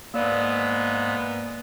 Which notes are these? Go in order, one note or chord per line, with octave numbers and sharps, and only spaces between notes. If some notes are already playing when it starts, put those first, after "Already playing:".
G#2 A#3 B3 D5